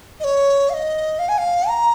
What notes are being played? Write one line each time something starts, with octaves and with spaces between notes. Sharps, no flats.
D#5
C#5
F5
D#5
F5
G#5
F5
A#5